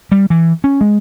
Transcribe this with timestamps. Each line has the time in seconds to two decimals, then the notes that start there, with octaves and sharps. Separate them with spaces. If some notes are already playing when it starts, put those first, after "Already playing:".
0.12 G3
0.30 E3
0.64 C#4
0.81 G#3